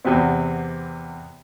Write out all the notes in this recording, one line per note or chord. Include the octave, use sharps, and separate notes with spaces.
E2 C3 B3 C4